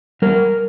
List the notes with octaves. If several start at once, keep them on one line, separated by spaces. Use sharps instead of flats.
G3 A#4